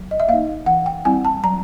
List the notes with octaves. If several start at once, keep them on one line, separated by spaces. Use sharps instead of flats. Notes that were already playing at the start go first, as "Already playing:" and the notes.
Already playing: F#3
D#5
E5
A#3 D#4 F5
E3 F#5
G5
G3 C4 E4 G#5
A5
F#3 A#5